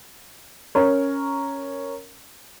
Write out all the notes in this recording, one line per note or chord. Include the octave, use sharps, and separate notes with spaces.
C#4 A#4 C#5